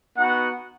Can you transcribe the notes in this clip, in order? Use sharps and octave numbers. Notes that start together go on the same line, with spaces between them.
B3 D#4 F#4 F#5